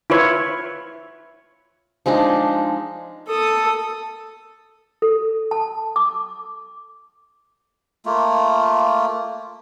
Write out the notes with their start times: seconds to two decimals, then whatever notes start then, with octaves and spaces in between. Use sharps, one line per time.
0.10 E4 F4 B4 C#5
2.06 F3 G#3 D4 D#4
3.27 A4 D#6
5.02 A4
5.51 A5
5.96 D6
8.06 A3 A#3 F4